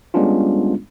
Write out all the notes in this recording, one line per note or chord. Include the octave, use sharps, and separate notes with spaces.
G3 G#3 B3 C#4 D4 F4